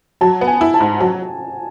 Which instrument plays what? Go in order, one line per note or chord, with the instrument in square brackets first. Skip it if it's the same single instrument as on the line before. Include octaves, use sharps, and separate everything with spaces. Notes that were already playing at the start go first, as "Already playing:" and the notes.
[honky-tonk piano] F#3 [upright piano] A5
[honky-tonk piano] B3
[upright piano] G#5
[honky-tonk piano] E4
[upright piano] A5
[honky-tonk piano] G#2
[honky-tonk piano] F#3 [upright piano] A5